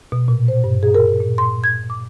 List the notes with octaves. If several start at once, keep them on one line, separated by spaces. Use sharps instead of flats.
B2
A#2
C5
G2
G#4
A#4
A#2
C6
G#6
D6